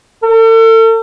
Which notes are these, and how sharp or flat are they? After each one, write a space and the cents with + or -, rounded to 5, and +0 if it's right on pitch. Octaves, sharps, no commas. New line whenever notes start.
A4 +40